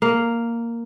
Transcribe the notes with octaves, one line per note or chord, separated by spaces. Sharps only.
A#3